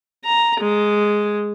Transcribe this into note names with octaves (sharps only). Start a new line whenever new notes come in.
A#5
G#3